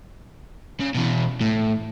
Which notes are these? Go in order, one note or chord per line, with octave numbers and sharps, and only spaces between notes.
C#3
B2 E3
A2